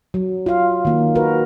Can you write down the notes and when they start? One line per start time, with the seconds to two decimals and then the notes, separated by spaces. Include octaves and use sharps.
0.14 F#3
0.46 F4 F5
0.85 D#3 A#3 F4
1.15 F#4 A#4 B4